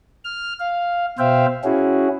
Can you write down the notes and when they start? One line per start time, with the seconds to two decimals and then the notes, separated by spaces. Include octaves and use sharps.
0.25 F6
0.60 F5
1.19 B2 C5 E5 F5 G5
1.64 C#4 E4 F#4 G#4